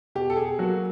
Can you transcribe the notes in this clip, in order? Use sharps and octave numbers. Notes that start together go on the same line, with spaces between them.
B2 G4
A4
G#4
F#3 A#3 F#4